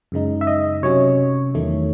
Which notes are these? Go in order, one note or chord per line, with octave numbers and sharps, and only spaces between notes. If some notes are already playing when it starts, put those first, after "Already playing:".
F#2 C#3 G#3 D#4
E5
D#5
C3 F#3 C#4 C#5
E2 D#3 A3